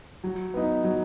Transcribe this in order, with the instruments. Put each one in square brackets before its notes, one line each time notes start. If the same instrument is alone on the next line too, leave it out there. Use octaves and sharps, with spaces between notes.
[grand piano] F#3
B3 D#4
F#3